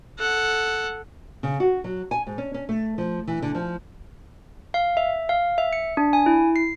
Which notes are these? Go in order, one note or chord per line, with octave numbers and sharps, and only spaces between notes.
A4 F#5
C#3
F#4
F#3
G#5
G#2
C#4
C#4
A3
F3
E3
D3
F3
F5
E5
F5
E5
C#7
D4
G#5
E4
C7